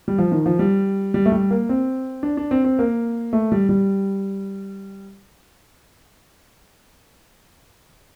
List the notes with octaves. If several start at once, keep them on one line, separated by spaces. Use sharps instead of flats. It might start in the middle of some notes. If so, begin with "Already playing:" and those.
G3
F3
D#3
F3
G3
G3
A3
G3
A#3
C4
D4
D4
C4
C4
A#3
A3
G3
G3